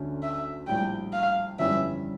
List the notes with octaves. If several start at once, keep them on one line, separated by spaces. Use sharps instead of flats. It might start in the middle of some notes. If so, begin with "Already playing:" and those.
Already playing: D2 D3 A3 C#4
E5
A#1 A2 G3 G5
F5
G1 F2 E3 G3 C#4 E5